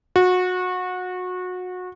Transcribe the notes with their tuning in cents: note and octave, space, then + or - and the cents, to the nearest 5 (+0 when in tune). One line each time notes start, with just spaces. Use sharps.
F#4 -25